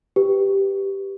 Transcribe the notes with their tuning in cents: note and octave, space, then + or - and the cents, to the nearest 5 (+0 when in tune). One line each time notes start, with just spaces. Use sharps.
G4 +0 B4 +0